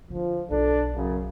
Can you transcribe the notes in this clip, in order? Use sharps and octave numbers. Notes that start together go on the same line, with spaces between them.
D3 F3 D4
B1 D4 A4
F#2 C#3